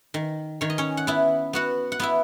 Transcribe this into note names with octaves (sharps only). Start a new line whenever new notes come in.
D#3
D#3 C#5
D#5
C#4 C#5
F#5
B3 E4 E5
B3 F#4 F#5
F#5
B3 E4 E5